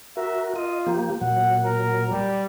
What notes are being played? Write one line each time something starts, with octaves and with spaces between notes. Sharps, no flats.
F#4 A#4 E5
F4 D#5
F3 A#3 G4
A#2 F#3 F#5
A#4
G3